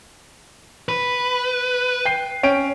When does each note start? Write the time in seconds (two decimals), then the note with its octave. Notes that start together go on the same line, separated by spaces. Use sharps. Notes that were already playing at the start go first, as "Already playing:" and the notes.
0.89 B4
2.05 G5 C7
2.43 C#4 G5 D7